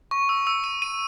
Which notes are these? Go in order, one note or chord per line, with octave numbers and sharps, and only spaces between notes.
C#6
E6
E6
D#7
D#7